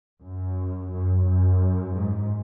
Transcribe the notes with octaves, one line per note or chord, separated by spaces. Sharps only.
F#2
F#2
F#2
G#2